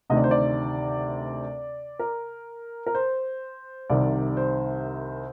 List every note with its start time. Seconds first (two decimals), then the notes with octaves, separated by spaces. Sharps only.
0.10 D2 C3 D#3 D#5
0.17 D5
0.24 C5
0.31 D5
2.00 A#4
2.87 A#4
2.95 C5
3.90 C2 C3 D#3 D5
4.37 C5